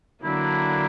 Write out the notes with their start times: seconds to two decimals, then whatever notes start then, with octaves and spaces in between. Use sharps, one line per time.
0.23 D3 F#3 A#3 D4 E4